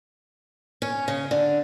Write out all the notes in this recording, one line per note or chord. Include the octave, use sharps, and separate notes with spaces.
C#4
C#3
D3